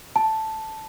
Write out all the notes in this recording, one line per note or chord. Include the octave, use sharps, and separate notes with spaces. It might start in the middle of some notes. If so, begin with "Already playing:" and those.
A5